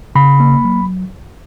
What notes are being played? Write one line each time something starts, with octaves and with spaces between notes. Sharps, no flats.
C#3 B5
A#3
F#3